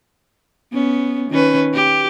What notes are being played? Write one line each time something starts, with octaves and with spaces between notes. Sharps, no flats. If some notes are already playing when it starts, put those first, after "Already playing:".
B3 C#4
D#3 C#4 B4
G4